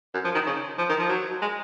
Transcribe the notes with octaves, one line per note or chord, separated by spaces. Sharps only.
F#2
F3
D#3
C#3
F3
D#3
F3
F#3
G#3